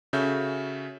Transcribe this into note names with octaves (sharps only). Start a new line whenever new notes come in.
C#3 C#4 F#4 A4 E5 G6